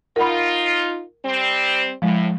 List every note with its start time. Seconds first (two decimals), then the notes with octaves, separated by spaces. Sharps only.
0.16 D#4 F4 A#4 F#5 B5
1.24 G3 C4
2.02 A2 F3 G#3